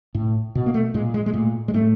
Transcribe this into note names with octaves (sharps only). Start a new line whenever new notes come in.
A2
B2
A#3
A3
A#2 G#3
G#3
G#3
A#2 A3
G#3
A2 A3